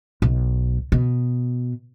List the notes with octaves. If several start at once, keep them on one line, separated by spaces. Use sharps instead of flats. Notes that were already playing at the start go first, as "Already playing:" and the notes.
B1
B2